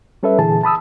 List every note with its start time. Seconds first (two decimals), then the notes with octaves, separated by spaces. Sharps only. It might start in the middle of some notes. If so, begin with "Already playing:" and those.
0.23 G3 C#4 A4 B4 E5
0.39 A#2 D3 E3 G#4 A5
0.64 A5 B5 D#6 E6